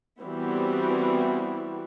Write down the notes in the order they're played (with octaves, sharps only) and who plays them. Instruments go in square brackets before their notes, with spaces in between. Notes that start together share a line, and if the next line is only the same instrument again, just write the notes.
[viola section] E3 G3 B3 C4 E4 F#4